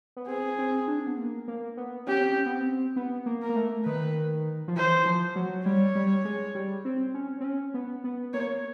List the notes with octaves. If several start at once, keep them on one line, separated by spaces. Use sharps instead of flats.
B3
C4 G#4
C4
D4
B3
A#3
A#3
B3
C#4 G4
C4
C#4
B3
C4
B3
A#3
A#4
A#3
A3
D#3 B4
F3
E3 C5
F3
F#3
G3 C#5
G3
G#3
G3
C4
C#4
C4
C#4
B3
B3
A#3 C#5